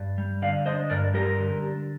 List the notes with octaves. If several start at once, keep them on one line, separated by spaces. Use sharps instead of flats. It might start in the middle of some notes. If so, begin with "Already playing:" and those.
Already playing: G2 D4
G3
D3 D5 F5
D4 C5 D#5
G2 A#4 D5
G3 G4 A#4
D3
D4